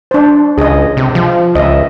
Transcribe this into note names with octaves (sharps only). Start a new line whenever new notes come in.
D4 C5
C#2 G#4 D#5
C3
F3
C#2 D#5 E5